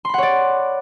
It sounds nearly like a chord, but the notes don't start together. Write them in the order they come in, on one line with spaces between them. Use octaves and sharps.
C6 B5 F#5 C#5 D5